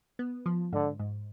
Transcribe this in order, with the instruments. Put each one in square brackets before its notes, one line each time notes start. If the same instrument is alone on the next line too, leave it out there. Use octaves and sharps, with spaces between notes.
[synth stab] B3
F3
[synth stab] G#2 [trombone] D3
[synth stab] G#2